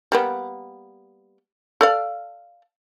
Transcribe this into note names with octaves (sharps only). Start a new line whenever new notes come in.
G3 A#3 B3
A4 D5 F5